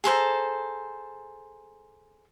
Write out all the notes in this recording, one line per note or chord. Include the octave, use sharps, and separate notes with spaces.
G#4 A4 C5 A#5